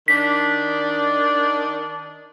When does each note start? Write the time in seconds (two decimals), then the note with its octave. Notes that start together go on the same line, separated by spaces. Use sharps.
0.08 D#3 D4 B6